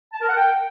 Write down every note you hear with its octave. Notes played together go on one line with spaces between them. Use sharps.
A5
A#4
F#5
G5